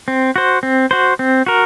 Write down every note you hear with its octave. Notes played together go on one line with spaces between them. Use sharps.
C4
F#4 C5
C4
F#4 C5
C4
F#4 A#4